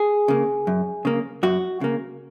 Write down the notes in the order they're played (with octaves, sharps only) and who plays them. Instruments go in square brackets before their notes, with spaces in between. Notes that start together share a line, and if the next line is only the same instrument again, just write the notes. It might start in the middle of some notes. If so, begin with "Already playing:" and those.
Already playing: [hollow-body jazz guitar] G#4
C#3 A#3
F#2
C#3 A#3
F#2 F#4
C#3 A#3